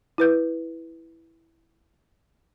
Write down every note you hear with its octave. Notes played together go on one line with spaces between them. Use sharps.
E4 B4 G6